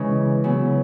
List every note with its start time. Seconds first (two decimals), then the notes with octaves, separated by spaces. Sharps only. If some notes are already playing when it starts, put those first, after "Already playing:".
Already playing: C#3 E3 G#3 C#4 E4
0.44 C#3 F#3 B3 E4